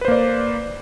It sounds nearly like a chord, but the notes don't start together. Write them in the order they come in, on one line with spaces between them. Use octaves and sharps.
B4 C5 A#3 D5